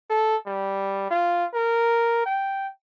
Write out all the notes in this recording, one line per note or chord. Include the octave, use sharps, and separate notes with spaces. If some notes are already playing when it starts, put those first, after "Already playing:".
A4
G3
F4
A#4
G5